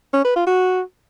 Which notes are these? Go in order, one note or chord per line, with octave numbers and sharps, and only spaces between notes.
C#4
B4
F4
F#4